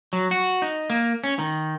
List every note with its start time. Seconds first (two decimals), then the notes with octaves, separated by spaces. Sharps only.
0.13 F#3
0.31 F#4
0.62 D#4
0.90 A#3
1.24 C#4
1.39 D#3